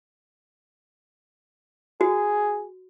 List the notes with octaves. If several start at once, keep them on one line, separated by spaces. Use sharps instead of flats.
F#4 G#4